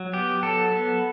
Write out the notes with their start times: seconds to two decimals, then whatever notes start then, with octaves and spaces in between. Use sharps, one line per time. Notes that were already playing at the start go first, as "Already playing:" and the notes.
Already playing: F#3
0.13 B3 G4
0.43 F#3 A4
0.72 B3